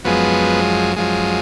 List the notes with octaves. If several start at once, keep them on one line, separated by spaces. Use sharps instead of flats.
F#2 F3 G#3 B3
F#2 F3 G#3